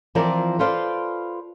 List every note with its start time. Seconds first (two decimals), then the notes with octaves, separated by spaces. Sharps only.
0.15 E3 F3 C4 F4 A#4 D5
0.59 F4 A4 B4 C5 D5 F5